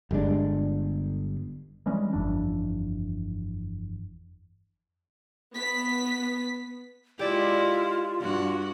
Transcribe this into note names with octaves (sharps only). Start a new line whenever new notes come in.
G1 G3 G#3 D4
E3 G3 G#3 C#4
G1 F2 E3 D4
B3 B6
G#3 E4 F4 G4 D5
G2 F#4